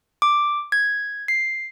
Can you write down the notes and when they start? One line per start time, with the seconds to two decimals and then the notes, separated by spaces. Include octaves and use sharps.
0.22 D6
0.72 G#6
1.28 C7